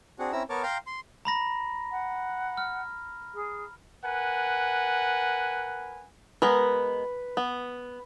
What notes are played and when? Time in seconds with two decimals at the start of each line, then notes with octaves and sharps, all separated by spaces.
0.19 C4 D4 F#4 G#4 F#5
0.32 C4 C#4 E4 A#5 E6
0.50 B3 A#4 C#5 A5 D6 F6
0.63 F5 G5 A#5 C6 F6 G6
0.87 C6
1.25 A#5 B5 A#6
1.91 F#5
2.58 F6
3.34 G#4
4.04 A#4 B4 F#5 G#5
6.42 G#3 B3 A#4 B4
7.37 B3